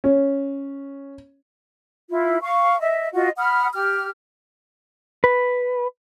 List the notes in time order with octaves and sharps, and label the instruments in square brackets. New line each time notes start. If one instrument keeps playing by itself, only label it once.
[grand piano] C#4
[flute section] E4 F4
F5 C#6
D#5 E5
F4 F#4 D#5
F#5 B5 D#6 F6
G4 F6
[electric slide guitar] B4